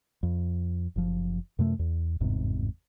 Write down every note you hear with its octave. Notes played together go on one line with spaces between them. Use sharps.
F2
F#1 F3
F#2 C3 A3
E2
G1 E2 G#2 C3